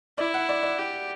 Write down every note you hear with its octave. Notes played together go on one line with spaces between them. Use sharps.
E4 D5
F#5
D5
D5
G4